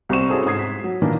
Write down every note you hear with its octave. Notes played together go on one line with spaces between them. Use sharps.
C2 G3 C4 C#6 E7
C#4 E4 F#4 G#4 A4 C5
G#2 D#6 G#6 C7
B6
F#3
A#2 D#3 E3 A#3 D4